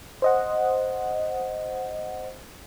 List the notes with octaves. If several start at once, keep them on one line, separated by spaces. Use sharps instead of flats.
C5 D#5 F#5